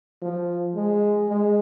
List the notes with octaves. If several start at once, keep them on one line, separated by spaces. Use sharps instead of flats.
F3
G#3
G#3